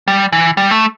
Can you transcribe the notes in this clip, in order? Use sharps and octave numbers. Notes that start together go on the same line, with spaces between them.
G3
E3
G3
A3